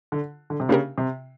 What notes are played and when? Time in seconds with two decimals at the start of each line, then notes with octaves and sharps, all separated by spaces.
0.12 D3
0.50 D3
0.60 C3
0.69 C#3 A#3 D4 G4 A#4
0.98 C3